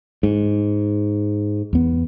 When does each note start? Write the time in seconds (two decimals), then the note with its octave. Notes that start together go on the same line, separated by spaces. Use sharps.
0.23 G#2
1.73 E2 B3